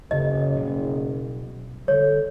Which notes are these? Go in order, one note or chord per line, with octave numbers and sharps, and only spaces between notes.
F#1 D2 C#3 D#5
B2 F#3 G3
D3 G3 A4 C#5